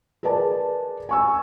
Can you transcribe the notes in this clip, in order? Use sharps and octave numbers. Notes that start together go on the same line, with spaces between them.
G#4 A#4 B4 D5 A5
G#5 C#6 E6